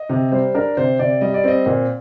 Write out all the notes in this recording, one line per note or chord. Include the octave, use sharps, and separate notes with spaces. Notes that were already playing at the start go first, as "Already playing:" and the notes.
Already playing: D#5
C3
G3 C5
D4 A#4
C3 C5
C3 D5
G3 D#5
D5
C4 D#5
A#2